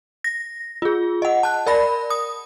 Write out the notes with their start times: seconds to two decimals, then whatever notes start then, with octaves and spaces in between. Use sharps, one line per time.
0.24 A#6
0.82 F4 G#4
1.22 D#5 F#5
1.43 A5 F#6
1.67 A#4 D5 B5 A#6
2.10 D#6